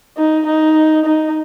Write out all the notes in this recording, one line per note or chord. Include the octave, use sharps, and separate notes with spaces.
D#4
D#4
D#4